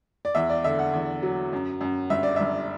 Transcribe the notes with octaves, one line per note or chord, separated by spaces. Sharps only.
D5
E2 E5
D5
D3 E5
F#5
E2
F#3
F#2
F#2
G1 E5
D5
G1 E5